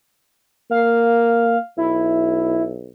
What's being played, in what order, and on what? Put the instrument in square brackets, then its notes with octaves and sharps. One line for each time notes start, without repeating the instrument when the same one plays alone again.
[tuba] A#3 [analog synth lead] F5
[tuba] B1 [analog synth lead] E4